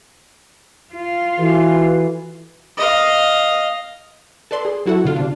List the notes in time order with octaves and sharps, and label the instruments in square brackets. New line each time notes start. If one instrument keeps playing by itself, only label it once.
[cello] F4
[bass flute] E3 [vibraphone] F#4 A4 B4
[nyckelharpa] D#5 F5
[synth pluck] A4 B4 D5 C6
G#4
F#3 E4 F#4 A4 F#5
B2 D3 F4
C3 D4